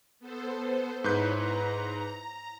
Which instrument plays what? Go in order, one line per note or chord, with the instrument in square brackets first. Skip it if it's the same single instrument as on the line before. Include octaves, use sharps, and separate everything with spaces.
[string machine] B3 A4 C5
[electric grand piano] G#2 B4 G6 [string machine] E4 C#5
[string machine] A#5